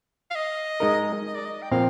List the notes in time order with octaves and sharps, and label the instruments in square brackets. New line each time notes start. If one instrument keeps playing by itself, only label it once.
[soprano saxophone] F5
D#5
[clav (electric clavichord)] G#3 D#4 A#4
[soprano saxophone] D#5
D5
D#5
G5
[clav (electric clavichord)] A#2 F3 C4 [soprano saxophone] F5